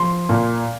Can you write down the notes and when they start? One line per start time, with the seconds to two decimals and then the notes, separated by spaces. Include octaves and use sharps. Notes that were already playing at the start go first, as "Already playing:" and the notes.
Already playing: F3 C6
0.29 A#2